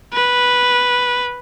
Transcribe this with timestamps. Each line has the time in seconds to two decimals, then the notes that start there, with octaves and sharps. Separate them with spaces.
0.13 B4